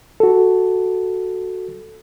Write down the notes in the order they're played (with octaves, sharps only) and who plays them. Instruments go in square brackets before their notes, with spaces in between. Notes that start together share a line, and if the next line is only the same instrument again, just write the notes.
[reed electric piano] F#4 A4